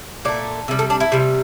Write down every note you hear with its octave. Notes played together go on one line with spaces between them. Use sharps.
A#2 A3 D5
C3 G3
A4
D4
E4
C3 G3